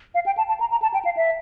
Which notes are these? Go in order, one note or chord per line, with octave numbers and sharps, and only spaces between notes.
F5
G5
A5
A5
A#5
A#5
A5
G5
F5
E5